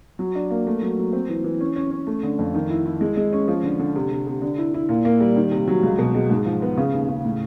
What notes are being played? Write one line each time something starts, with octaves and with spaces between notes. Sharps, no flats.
F#3
D4
A#3
A3
F#3
F#3
C4
E3
E3
C#4
C#4
C#4
A3
D3
F2
D#3
E4
E4
G#3
G#3
C#4
F3
D3
D3
C3
C3
C3
D3
E4
E4
A#2
A#3
G3
D#3
C3
F#3
C#2
B2
G#3
G#2
F3
B3
C#3
D#2
C#3
A2